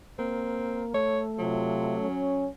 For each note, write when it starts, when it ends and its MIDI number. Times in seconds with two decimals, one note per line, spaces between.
0.19 0.94 58
0.19 0.83 60
0.94 2.09 57
0.94 1.21 73
1.39 1.94 48
1.39 2.48 54
1.39 1.94 65
1.99 2.47 61